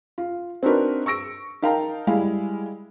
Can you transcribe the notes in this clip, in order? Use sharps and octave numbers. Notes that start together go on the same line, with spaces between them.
F4
C4 D4 D#4 F#4 A#4 B4
C#6 E6 A#6 D7
D#4 A#4 F5 G5 A5 A#5
G3 G#3 E4 F5